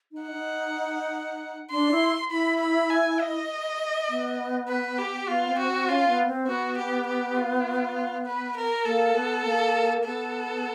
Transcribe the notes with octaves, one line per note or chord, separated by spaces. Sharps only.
D#4
F#5
D#4
D4 C6
E4
E4 B5
B5
G#5
D#5
B3
B4
G4
B3 F4
C4
F#4
C4
C#4 F4
B3
C4
B3 F#4
G4
G4
F4
B4
A#4
A#3 A4
B3
A#3
B3 A4